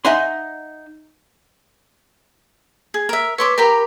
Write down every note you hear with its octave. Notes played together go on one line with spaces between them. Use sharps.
D#4 D#5 E5 F#5 G#5 C6
G#4
A#4 E5
B4 C#5 C6 D6 E6
G4 A#4 G5 A#5 B5